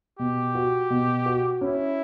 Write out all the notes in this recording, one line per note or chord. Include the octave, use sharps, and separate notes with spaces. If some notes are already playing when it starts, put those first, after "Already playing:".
B2 G4
F#4
B2
F#4
C#4 E4